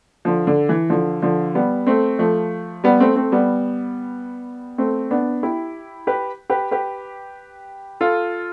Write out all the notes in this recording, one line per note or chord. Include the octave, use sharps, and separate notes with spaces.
D3 F3
D3
E3
D3 F3
D3 F3
G3 B3
A3 C4
F3 A3
G3 B3
A3 C4
A3 C4
G3 B3
A3 C4
B3 D4
E4 G4
G4 B4
G4 B4
G4 B4
F4 A4